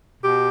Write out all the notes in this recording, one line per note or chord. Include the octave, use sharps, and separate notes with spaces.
B2 G4